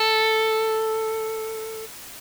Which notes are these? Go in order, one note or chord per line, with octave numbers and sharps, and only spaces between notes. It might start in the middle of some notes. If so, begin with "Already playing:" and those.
Already playing: A4